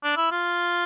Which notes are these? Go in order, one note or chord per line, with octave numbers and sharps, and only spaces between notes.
D4
E4
F4